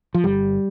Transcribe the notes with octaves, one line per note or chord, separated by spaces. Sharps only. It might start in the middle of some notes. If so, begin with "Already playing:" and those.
F3
G1 G3